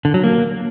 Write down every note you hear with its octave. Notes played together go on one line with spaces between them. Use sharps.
D3
F#3
A#3